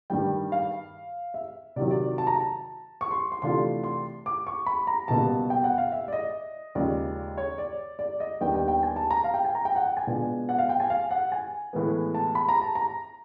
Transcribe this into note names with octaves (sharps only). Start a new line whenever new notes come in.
G2 D#3 G3 G5
F5
E5
C3 D#3 F#3 D5
D5
A5
A#5
A5
C#6
C6
C6
C3 E3 A3 D4 F4 C6
C6
D6
C#6
B5
A#5
C#2 B2 G3 A#3 A5
G5
F#5
F5
E5
D5
D#5
D#2 C#3 F3 G#3 D5
C#5
D5
D5
D#5
D#2 D#3 G3 B3 D4 G5
G5
G5
G#5
A5
A#5
F5
G5
G#5
A#5
G5
F#5
G5
G#5
B2 G#3 B3 D4 F4
F#5
F5
G5
G#5
F5
F#5
G#5
A2 E3 G#3 B3
A5
B5
A#5
A5
A#5